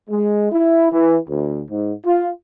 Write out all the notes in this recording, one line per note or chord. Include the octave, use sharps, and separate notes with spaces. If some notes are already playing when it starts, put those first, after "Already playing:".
G#3
E4
E3
D2
G#2
F4